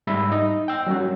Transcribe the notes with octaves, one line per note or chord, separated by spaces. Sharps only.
G#2 G3 E5 B5 E6
D#4 D#5
G5 E6
F#3 G3 C#4 F#4